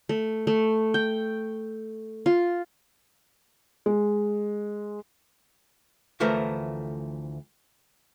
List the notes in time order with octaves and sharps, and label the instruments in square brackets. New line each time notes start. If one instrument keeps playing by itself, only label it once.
[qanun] A3
A3
G5
F4
[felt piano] G#3
[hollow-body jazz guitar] D2 E3 F3 A3 A#4